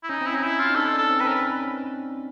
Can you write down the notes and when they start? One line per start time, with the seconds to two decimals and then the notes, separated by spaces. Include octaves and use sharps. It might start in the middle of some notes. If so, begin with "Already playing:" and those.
0.04 E4
0.09 C#4 D#4
0.21 C4
0.26 E4
0.33 C#4 D#4
0.43 E4
0.60 F4
0.70 D#4
0.76 D4 A4
0.93 D4 A4
1.09 C4
1.20 C4 B4
1.27 C#4 A#4
1.35 B4